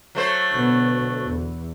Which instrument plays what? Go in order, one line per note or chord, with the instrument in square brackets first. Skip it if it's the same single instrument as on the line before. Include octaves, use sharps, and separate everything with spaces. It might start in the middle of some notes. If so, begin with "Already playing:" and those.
[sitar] F#3 A3 C5
[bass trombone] D2 [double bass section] B2 B3
[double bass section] E2